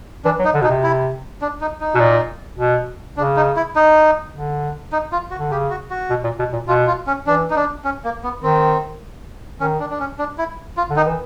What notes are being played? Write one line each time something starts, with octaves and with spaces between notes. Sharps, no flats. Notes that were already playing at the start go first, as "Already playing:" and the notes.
E3 D4
F#3
D#4
D3
B2 D#4
C3
E4
D4
D#4
D#4
B2
A#2
B2
C#3 D4
D#4
E4
D#4
D3
D#4
F4
F#4
D3
C#3 G4
F#4
F#4
B2
A#2
B2
A#2
B2 F4
F4
C#4
E3 D4
D#4
D4
C#4
A#3
B3
D#3 C4
D#3 C#4
D4
D4
C#4
D4
E4
F4
D3
D#3 D#4
E3